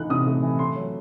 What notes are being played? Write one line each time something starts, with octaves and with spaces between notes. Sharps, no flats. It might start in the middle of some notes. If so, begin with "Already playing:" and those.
Already playing: E3 A3 D#4 F#6
C3 D#6
A3
E3
A3 C6
F#3